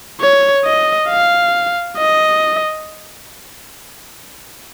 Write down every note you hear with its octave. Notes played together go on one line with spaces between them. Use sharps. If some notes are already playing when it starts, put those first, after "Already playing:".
C#5
D#5
F5
D#5